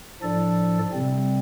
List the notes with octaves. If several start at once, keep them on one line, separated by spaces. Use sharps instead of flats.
A2 F3 D4 A4 D5
C3 G3 C4